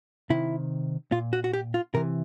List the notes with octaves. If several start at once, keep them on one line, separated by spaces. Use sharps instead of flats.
C3 D#3 E4
A#2 F4
F#4
F#4
G4
F4
C3 E3 A#4